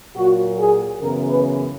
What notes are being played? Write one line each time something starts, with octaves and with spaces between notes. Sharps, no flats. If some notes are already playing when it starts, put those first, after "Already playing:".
A#2 F#3 A#3 F#4
G#4
F#2 C#3 E3 B3 A#4
B4